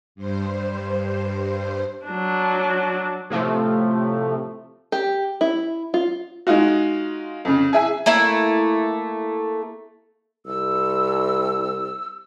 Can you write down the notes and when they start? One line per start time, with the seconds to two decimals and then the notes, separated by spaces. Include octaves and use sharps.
0.15 G2 C5
2.06 F#3 D4
3.30 A2 C3 F3 A3
4.92 G4
5.41 E4
5.94 F4
6.47 G#3 D#4 F4 F#4
7.45 F2 C#3
7.73 G#4 E5 G#5
8.06 A3 A#3 E4
10.46 C2 E6